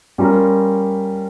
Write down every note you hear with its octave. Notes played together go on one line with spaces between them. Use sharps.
G3 C#4 F4 A#4